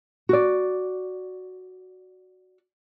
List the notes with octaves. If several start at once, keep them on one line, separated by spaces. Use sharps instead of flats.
F#4 D5